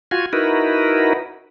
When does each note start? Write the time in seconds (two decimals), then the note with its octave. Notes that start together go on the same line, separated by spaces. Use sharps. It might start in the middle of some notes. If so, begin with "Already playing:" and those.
0.11 F4 F#4 G#5
0.33 D#4 E4 F#4 A#4 B4